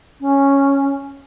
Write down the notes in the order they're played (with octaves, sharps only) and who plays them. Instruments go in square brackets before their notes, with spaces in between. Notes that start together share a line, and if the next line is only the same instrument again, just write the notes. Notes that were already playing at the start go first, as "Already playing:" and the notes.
[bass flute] C#4